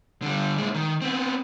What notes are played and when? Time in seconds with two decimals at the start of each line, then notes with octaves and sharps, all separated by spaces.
0.22 D3 G3
0.58 A#2 G#3
0.75 D#3
1.01 B3 C4